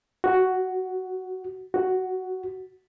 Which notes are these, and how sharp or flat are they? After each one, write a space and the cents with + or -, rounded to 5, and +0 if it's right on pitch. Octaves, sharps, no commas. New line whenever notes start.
F#4 +5
F#4 +5